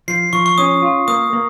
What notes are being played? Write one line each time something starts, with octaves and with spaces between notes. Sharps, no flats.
F3 C7
F3 C#6
C#6
C#4 D#6
F4
A#3 D#6
A#3